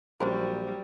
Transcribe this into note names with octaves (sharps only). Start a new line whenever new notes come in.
A#1 F#3 G3 C#4 F#4 G4 A#4 C5